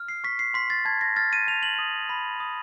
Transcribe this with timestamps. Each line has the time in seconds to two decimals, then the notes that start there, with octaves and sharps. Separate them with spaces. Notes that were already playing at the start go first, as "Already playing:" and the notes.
Already playing: F6
0.08 C7
0.24 C#6 B6
0.39 C7
0.54 C6 B6
0.70 A6
0.85 A5 G#6
1.01 A#6
1.16 F6 A6
1.33 D#7
1.48 A5 F7
1.63 F#7
1.79 D#6
2.09 B5
2.40 D#6